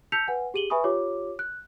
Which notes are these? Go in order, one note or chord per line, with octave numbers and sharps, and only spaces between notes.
A5 E6 G6 B6 C#7 F7
B4 F#5 G#5
G4 G#4 D#7 F#7 G7
B4 E5 G#5 B5 C#6 D#6
F4 G4 C#5 D6
F#6